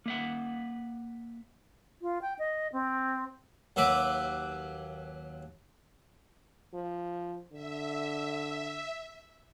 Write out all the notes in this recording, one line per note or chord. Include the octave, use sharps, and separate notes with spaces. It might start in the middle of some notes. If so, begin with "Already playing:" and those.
A#3 E5 F#5
F4
G5
D#5
C4
D#2 F#3 B4 E5 D6
F3
D3 E5